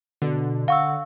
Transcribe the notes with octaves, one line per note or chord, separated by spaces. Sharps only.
B2 D3
F5 F#5 C#6 E6